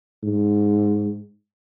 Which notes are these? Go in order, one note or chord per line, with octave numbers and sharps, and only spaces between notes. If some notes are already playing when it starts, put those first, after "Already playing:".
G#2